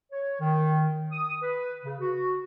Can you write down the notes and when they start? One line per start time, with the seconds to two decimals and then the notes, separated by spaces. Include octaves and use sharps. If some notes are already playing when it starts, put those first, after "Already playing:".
0.12 C#5
0.40 D#3
1.12 D#6
1.43 B4
1.84 C#3
2.01 F#4